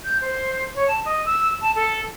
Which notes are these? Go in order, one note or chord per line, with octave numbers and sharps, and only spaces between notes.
G6
C5
C#5
A5
D#5
E6
A5
A4